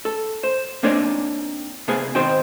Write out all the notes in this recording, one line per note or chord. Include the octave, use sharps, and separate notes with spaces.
A4
C5
A#3 C4 D4 D#4 C#5 D5
C3 B3 G#4 F5 G#5
D#3 C4 D#4 C5 G5